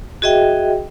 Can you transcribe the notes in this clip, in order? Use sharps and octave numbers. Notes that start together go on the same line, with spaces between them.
F#4 G#4 D#5 E5 G5